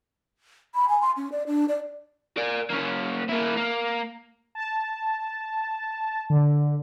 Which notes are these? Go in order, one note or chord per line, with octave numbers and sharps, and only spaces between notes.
B5
G#5
C6
C#4
D5
D4
D5
A#4 D5
A#3 C#4
A#3 E4
A#3
A5
D3